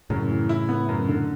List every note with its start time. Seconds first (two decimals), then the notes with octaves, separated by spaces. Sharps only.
0.10 F#2 A2 C#3
0.30 E3
0.49 E4
0.69 B3
0.89 F#2
1.09 D3